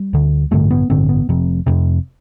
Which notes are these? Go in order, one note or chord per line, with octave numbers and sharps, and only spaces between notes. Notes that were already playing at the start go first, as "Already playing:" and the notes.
Already playing: G3
D2 D3
A1 G2 D3 A3
B3
A1 G2 D3 C4
B3
F1 F2 C3
F1 F2 C3